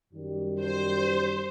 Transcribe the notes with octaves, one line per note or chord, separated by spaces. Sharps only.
F#2 D#3 G3
C5